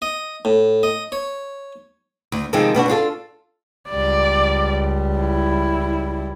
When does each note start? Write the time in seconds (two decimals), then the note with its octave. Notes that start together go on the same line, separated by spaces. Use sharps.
0.02 D#5
0.45 A2
0.83 D#5
1.12 C#5
2.32 D2
2.53 C3 D#3 F3 G#3 C4 D#4
2.75 B2 B3 D4 F#4
2.88 D4 F4 G#4 A4
3.89 C#2 G3 D5
5.19 E4